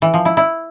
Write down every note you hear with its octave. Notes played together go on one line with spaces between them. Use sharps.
E3
F3
E4
E4